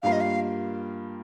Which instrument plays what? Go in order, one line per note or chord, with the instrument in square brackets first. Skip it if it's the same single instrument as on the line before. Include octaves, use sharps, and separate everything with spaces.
[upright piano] G2 G3 A#3 F4 A#4 [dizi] F5
[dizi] D#5
F5